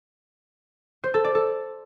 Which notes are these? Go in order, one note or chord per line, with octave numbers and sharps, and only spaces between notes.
C5
A4
D5
A4